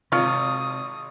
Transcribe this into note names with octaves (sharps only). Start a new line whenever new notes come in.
G#1 C3 F4 C#6 D#6 F6